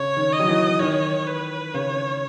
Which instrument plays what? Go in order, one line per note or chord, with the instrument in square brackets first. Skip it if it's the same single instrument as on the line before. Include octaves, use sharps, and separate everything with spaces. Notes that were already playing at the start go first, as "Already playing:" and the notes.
Already playing: [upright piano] C#3 [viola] C#5
[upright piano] D#3
[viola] D#5
[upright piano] F#3
E3
[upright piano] D#3 [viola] C#5
[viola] B4
[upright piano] C#3 [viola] C#5